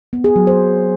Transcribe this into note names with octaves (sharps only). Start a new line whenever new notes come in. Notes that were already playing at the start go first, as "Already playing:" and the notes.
B3
G#4
F#3
C5